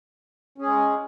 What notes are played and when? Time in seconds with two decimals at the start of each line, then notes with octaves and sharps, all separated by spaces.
0.58 C#4
0.62 G#4
0.66 G#3